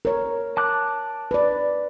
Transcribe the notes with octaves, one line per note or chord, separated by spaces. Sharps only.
A#4 C#5
A5 D6 F#6
B4 D5